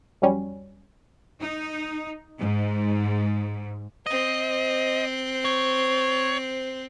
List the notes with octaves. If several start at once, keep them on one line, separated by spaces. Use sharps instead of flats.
F2 F#3 G3 C#4
D#4
G#2
C4 C5 D#5
C#5